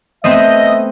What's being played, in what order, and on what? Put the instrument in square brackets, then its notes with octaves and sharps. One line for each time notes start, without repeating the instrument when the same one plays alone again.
[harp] A3 B3 C4 [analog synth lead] D#5 [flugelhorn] E5